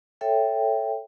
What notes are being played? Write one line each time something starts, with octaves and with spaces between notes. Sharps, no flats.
A4 C#5 E5 G5